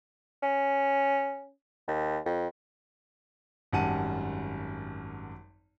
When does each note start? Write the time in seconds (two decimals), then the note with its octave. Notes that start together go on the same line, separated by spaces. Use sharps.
0.43 C#4
1.88 D#2
2.26 F2
3.73 G#1 F#2 G3 F#5 A5 D#7